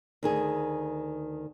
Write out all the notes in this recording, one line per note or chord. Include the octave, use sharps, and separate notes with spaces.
D2 D#3 G#4